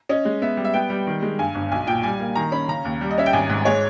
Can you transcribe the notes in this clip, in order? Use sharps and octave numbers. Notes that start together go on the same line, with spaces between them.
C#4 D#5
G#3
B3 E5
G3
E5
B3 G5
G3
D#3
G#3
G2 G#5
G1
B1 G#5
A#2 G5
G3 G#5
A#3
D#3 A#5
C#4 B5
C#3 A#5
D#2
G3
D#5
C#4 E5
G5
G#1 G#5
G#2
G#3 C#5